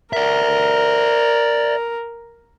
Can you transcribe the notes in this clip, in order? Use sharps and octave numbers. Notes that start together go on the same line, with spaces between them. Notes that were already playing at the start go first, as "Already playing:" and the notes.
A#4 D5 E5